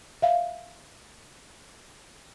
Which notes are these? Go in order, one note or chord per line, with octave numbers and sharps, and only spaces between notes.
E5 F5